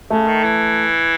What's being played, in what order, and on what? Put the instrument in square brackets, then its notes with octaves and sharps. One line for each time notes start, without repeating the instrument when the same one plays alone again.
[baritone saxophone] C#3 [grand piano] A3
[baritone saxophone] D#3
E3